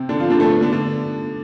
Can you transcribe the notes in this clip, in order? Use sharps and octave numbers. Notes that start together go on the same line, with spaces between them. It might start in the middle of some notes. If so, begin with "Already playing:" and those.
Already playing: C3 C4
D3 D4
F3 F4
D3 D4
A3 A4
B3
D3 D4
D3 D4